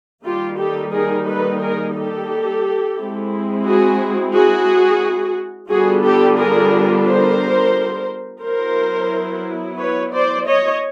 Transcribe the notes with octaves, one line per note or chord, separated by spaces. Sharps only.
D#3 G3 A#3 D#4 F4 G4
G4 A4
G#4 A#4
A4 B4
G#4 A#4
G4 A4
G#3 C4 E4
F#4 G#4
F#4 G#4
D3 G3 B3 D4 F4 F#4 G#4
G4 A4
G#4 A#4
A#4 C5
F#3 B3 E4 A#4 C5
B4 C#5
C5 D5
C#5 D#5